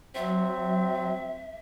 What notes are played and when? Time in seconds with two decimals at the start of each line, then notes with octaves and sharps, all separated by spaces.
0.15 F#3 C4 E5